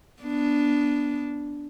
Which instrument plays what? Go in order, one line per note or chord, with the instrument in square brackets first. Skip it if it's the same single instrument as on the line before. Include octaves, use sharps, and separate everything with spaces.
[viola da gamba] B3 D4